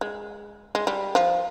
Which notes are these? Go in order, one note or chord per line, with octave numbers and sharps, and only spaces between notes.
G#3
G#3
G3
F3